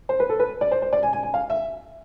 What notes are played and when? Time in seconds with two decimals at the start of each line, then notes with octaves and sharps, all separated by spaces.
0.09 C5
0.20 B4
0.29 A4
0.40 B4
0.61 D5
0.71 C5
0.82 C5
0.93 D5
1.03 G#5
1.13 G#5
1.23 G#5
1.34 F5
1.50 E5